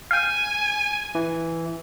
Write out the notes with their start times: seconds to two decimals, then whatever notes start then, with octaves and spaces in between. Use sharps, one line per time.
0.11 F5 G5 G#5
1.15 E3